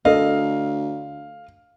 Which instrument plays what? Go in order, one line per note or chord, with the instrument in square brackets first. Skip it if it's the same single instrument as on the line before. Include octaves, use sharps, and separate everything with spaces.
[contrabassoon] D2 [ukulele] A4 D#5 [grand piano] F5